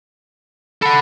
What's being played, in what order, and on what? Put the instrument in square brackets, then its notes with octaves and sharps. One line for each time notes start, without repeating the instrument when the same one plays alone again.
[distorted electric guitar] A4 F#5 [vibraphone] B5